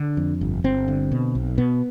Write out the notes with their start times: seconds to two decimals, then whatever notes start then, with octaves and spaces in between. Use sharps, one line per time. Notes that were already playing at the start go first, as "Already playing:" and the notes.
Already playing: D3 D4
0.17 F2
0.41 G1
0.64 G1 C4
0.88 D3
1.12 B2
1.35 B1
1.58 B2 B3